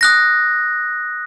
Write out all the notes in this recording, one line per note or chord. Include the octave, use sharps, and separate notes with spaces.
D#6 F#6 A#6